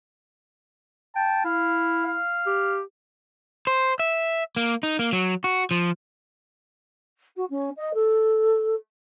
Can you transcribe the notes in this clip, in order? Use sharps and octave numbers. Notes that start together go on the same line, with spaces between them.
G5 A5
E4 F5
F5
G4
C5
E5
A#3
D#4
A#3
F#3
F#4
F3
F#4
C#4
D#5
A4